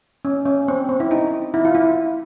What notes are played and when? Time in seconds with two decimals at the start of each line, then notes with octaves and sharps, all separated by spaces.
0.25 C#4
0.46 C#4
0.68 C4
0.89 C4
1.00 E4
1.11 D#4
1.54 E4
1.65 F4
1.75 E4